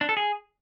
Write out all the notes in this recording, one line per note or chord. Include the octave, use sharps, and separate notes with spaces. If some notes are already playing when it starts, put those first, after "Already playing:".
D4
A4
G#4